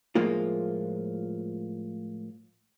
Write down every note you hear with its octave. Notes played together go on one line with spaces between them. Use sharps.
A2 F3 G#3 A#3 F4